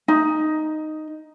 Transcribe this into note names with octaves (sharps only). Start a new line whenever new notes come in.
D#4